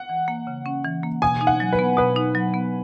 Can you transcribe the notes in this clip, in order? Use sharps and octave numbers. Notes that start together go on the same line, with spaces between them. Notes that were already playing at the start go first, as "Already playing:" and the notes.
Already playing: F#5
E3
A#3
C#3
C#4
E3
A#3
B2 G#5
D#4
F#5
F#3
B4
B3
B2 B4
D#4
F#3
B3